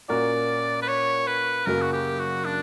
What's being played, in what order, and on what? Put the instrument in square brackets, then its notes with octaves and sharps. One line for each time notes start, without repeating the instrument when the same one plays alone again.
[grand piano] A#2 A#3 C#4 F#4 A#4 [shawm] D5
[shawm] B4
C#5
B4
[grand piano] F#2 C#3 F#3 A#3 [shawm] A#4
[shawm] F#4
G4
F#4
D4